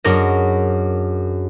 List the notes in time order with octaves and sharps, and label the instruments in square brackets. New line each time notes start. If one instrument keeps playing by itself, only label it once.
[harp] F#2 D4 G#4 A#4 C#5 D#5